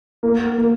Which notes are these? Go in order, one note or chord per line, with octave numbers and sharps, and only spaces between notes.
A#3
A#3